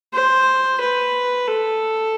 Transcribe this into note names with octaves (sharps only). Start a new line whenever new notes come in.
C5
B4
A4